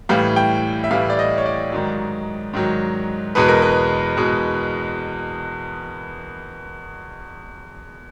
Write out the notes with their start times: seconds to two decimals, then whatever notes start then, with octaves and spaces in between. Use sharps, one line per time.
0.09 A2 E3 G3 F5
0.36 G5
0.84 E5
0.91 A2 E3 G3 F5
1.10 D5
1.19 D#5
1.38 C#5
1.46 D5
1.72 G#2 D#3 F#3
2.54 G#2 D#3 F#3
3.35 E2 B2 G#3 B4
3.48 A#4
3.62 B4
4.17 E2 B2 G#3